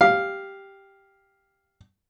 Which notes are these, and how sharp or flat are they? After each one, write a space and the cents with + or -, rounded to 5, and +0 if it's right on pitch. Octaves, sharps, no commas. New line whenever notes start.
G4 +0 F5 +0